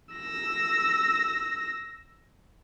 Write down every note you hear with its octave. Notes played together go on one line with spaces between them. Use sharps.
E6 A#6